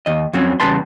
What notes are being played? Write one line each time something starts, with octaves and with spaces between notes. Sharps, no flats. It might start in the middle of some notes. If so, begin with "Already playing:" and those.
D#2 D#5
F2 F#3 C4 C#4
E2 C#3 G3 B4 A5 C6